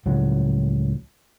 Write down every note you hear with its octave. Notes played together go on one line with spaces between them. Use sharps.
C#2 A2 F3 F#3